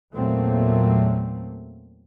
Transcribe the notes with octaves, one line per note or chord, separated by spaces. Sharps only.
E2 A#2 F#3 A3 A#3 C4